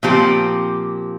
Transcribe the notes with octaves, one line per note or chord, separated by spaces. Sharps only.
A#2 F3 C4 G4